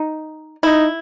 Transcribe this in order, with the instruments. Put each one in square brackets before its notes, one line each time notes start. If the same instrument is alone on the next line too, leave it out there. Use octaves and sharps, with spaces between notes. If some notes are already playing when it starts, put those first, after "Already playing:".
Already playing: [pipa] D#4
[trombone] D#4 [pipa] E4